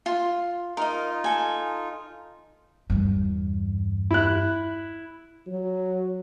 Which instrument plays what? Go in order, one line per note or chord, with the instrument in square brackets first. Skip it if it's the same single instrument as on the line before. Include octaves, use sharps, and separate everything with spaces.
[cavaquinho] F4 C6
[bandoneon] D#4 F4 [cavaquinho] A#4 D#5
[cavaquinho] A4 G#5
[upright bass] E2 G2
[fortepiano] E4 F#6
[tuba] F#3